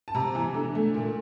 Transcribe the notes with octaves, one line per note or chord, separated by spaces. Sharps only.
A5
C3 A#5
E3
D3
A3
A#2